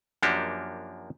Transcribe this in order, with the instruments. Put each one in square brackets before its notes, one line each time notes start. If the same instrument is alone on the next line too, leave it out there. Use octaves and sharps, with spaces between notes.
[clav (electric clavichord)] F#2 F3 A#3 D4 F#4 G4